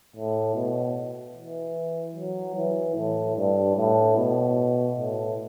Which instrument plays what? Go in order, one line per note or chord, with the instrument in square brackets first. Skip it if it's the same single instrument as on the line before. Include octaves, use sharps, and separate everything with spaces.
[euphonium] A2
B2
E3
F#3
E3
A2
G2
A2
B2
A2